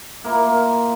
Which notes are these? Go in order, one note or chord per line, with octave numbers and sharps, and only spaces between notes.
A#3 E4 F4